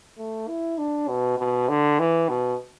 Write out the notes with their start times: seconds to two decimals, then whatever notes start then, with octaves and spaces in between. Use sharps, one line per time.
0.18 A3
0.48 E4
0.78 D4
1.08 B2
1.38 B2
1.69 D3
1.99 E3
2.29 B2